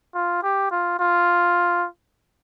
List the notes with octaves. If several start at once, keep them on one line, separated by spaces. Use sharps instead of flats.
F4
G4
F4
F4